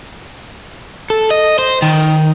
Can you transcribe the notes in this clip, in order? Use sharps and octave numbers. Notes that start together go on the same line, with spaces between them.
A4
D#5
C5
D#3